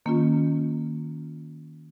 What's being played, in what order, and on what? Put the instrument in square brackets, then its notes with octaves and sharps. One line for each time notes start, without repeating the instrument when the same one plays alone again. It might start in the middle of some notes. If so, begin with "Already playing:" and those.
[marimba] D#3 A#3 C#4 F4